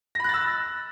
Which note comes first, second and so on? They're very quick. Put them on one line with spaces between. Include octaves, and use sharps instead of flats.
A#6 B5 F#6 A6 E6